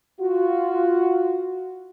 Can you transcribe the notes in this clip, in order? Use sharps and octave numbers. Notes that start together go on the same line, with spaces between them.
F4 F#4